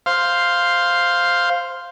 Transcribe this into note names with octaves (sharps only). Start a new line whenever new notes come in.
C5 F5